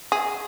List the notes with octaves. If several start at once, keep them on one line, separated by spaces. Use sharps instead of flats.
G#4